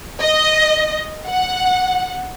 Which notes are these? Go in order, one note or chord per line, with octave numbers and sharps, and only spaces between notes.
D#5
F#5